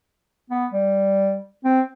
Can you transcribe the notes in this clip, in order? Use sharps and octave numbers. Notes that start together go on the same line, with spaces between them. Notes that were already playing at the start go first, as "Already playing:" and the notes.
B3
G3
C4